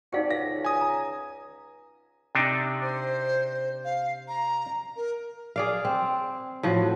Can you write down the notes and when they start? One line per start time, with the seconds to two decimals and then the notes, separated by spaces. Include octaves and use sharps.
0.13 C4 D#4 F#4 D5 F5 G5
0.31 C#2 F5 A#6
0.65 G#5 D#6
0.81 A#5
2.35 C3 D4 D#4
2.81 C5
3.85 F5
4.28 A#5
4.97 A#4
5.56 G#4 D5 F5
5.85 C4
6.63 A2 F3 F#4